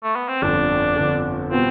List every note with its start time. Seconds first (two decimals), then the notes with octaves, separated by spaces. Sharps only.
0.03 A3
0.16 B3
0.28 C4
0.42 G1 F2 D3 D4
0.96 G1 F2 D3
1.51 B2 G3 B3 C4 F4